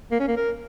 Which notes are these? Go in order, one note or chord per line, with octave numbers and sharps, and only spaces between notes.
A#3
C#4
A#3
A#4